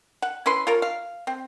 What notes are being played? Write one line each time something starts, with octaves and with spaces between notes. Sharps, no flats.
F#5
C#4 E4 B4 C6
F4 A#4 C#5
F5
C4